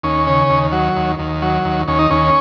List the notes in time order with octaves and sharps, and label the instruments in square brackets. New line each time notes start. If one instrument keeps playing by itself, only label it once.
[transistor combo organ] D#2 C#4
C#3
D#2
F#3
D#2
D#2
F#3
D#2
D#2 C#4
D#4
D#2 C#4